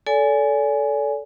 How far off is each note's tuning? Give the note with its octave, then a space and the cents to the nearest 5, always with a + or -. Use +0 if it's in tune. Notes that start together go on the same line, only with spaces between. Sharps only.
A4 -5 D5 -40 G#5 +5